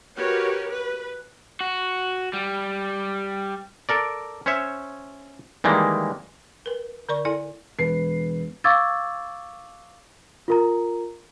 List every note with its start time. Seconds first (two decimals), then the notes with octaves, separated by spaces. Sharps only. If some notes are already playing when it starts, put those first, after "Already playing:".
0.17 F#4 G4 A#4 B4 C#5
0.71 B4
1.61 F#4
2.33 G3
3.89 A4 A#4 D5
4.46 C#4 C5 C#5 E5
5.64 D#3 E3 G3 G#3 A#3
6.66 A#4 B4
7.09 D3 A#4 D5 C#6
7.25 E4 A4 D5 G#5
7.78 E1 B4 C7
8.64 F5 C#6 D6 E6 G#6 A6
10.48 F4 A#4 A#5